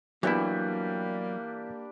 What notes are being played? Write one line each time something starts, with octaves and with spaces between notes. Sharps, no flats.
E3 F#3 G3 A#3 B3 D4 E4 G4